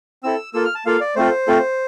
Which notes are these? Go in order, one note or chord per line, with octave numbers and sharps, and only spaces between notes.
C4 E4 A4 E6
A#3 F4 A4 E6
F6
A5
A#3 F4 A4 F5
D5
A3 C4 F4 A4 C5
A3 C4 F4 A4